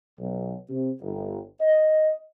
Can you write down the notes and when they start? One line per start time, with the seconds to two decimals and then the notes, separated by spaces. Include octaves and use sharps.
0.19 B1
0.70 C3
1.01 G1
1.61 D#5